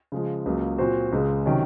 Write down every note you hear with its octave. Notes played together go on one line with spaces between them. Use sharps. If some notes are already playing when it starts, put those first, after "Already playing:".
C#3 F3 G#3
C#2 C#3 F#3 A#3
A#2 F#3 C4 F#4 C5
C#2 C#3 G#3
C3 D#3 F#3 C#4